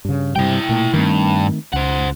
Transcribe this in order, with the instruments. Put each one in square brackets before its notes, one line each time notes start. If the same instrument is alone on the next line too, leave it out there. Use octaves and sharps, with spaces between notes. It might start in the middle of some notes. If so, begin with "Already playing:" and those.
[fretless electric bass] G2 C#3
[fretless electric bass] G2 C3 G3 [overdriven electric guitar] E4 G5
[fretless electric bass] A#2 A3 A#3
[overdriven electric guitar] G2 [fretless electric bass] D#3 A3 C4
[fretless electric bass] C#2 [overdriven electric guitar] C5 F#5